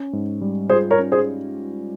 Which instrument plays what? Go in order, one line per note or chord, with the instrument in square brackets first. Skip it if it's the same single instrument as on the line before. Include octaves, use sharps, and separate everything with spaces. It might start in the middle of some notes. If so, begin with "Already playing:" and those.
Already playing: [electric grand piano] C#4
G#2
G3
[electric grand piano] F4 [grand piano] G#4 C5
[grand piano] A#4 C#5
[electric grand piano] C#4
[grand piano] G#4 C5